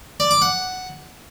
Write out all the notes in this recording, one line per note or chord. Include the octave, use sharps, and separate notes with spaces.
D5
D6
F#5